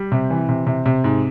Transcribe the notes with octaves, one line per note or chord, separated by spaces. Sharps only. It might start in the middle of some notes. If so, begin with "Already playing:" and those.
Already playing: G3
C3
E3
C3
C3
C3
G#2